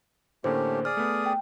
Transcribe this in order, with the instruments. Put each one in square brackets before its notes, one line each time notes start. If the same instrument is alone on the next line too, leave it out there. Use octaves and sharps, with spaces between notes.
[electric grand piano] A2 D3 A#3 [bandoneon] A3 C#4 G4 [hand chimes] C5
[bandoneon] G#4 D5 D#6 [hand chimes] F6
[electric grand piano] A3 B3
[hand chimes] G5